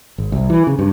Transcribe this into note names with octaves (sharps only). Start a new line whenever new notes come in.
G#1
C2
E3
C#3
G2